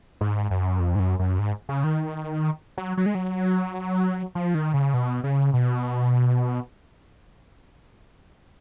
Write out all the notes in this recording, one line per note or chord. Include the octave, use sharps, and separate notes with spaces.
G#2
F#2
F2
G#2
F#2
F#2
G#2
C#3
D#3
F#3
F#3
G#3
F#3
F3
D#3
C#3
B2
C#3
B2